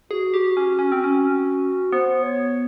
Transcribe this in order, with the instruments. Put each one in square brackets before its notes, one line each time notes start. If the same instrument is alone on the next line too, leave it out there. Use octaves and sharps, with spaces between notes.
[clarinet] F#4 [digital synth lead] G#4
[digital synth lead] G4
C#4
C#4
C4
C#4
[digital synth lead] B3 [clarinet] C5
[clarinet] C#5